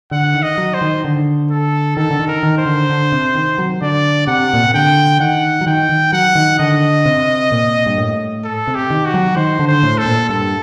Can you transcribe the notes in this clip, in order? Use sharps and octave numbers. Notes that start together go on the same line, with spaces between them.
D3 F#5
D#3
D#5
F#3
C5
D#3
D3
A4
D#3 A4
D3
D#3
A#4
D#3
C5
D3
D3
C3
D#3
F#3
D3 D5
C3 F#5
A#2
C3
D3 G5
D#3 F#5
F#3
D#3 G5
D#3
F#3 F#5
D#3
D3 D#5
C3
A#2
G2
A2
A4
C3
G4
D#3
F#4
F#3
D#3 C5
D3
C5
A2
A4
A#2
G2 A4